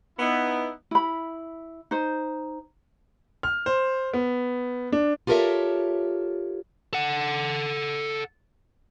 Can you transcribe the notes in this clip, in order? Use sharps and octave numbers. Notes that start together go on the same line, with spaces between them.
B3 D#4 E4
E4 B5
D#4 C5
F6
C5
B3
D4
F4 G4 A4 A#4 C#5 E5
A4 F#5